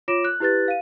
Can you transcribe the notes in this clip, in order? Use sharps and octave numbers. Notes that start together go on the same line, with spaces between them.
F4 C#5 D6 A#6 D7 E7
F#6
E4 G4 B4 F#6 A6
F5 D#7